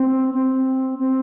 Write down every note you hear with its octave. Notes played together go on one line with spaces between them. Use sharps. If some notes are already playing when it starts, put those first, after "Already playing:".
Already playing: C4
C4
C4